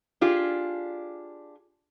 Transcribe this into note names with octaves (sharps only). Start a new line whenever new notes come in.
D4 F4 G4 G#4